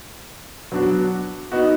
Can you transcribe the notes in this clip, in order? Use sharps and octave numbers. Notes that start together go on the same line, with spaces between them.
F#3 B3 D4 F#4
B3 D#4 F#4